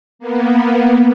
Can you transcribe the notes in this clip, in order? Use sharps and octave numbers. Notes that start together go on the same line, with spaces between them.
A#3 B3